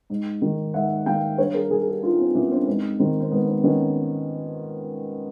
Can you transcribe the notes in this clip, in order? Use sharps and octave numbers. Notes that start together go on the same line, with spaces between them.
G#2
D#3
G#2 E5 F#5
D#3 F5 G5
G2 B4 C#5
G#4 A#4
E3 G#4 A#4
G#4
G4 A4
G2 D#4 F4
C4
E3 B3 C#4
C4 D4
G#2 C4
D#3 C4
C4
G#2 B3
C4
D#3 B3 C#4